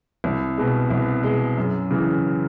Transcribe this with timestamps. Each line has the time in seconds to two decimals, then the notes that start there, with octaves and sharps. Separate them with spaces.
0.24 C2
0.57 B2 G#3
0.91 C2
1.23 B2 G#3
1.57 F#2
1.91 C#3 E3 G#3